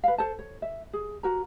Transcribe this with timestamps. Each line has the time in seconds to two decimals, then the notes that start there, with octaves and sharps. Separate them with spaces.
0.04 B4 F5
0.18 A4 C5 A5
0.39 C#5
0.62 E5
0.93 G#4
1.23 F#4 A#4 A#5